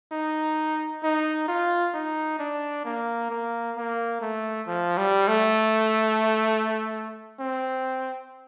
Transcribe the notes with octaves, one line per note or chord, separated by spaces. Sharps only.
D#4
D#4
F4
D#4
D4
A#3
A#3
A#3
A3
F3
G3
A3
C4